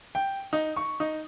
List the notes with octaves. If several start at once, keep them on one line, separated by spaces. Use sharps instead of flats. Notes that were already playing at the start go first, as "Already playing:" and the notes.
G5
D#4
C#6
D#4